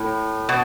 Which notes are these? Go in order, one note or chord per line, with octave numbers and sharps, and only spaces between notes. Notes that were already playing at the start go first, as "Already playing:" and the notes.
Already playing: A2
B2